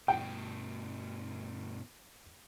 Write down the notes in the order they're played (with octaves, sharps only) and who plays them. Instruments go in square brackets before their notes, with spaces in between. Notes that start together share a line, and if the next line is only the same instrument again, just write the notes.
[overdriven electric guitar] G2 B2 [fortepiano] G5